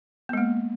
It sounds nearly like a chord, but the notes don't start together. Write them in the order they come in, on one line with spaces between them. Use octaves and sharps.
B3 G#3 A#3